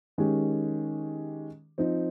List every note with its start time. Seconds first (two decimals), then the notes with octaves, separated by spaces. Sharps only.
0.18 D#3 G#3 C#4 G4
1.78 F3 C4 D#4